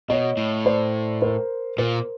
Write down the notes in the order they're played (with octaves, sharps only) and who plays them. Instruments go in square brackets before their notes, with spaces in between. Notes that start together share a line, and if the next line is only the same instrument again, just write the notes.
[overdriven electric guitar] B2 [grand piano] C#5 D#5
[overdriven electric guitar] A2
[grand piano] C5 D5
A#4 C5
[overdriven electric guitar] A#2 [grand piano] A#4 C5